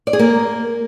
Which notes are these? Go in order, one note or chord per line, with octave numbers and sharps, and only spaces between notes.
D5
G#4
A#3